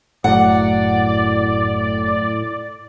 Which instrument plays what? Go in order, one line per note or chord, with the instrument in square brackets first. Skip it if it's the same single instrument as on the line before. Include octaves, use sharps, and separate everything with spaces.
[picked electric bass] F#1 F#3 [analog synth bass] A2 [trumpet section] D5 [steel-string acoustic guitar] F#5